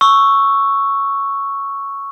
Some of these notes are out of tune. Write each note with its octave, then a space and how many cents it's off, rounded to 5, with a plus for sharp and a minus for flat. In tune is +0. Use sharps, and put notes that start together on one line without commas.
C#6 +0 E6 +0